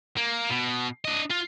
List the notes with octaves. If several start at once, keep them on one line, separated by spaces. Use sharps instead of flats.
A#3
B2
D4 D#5
F4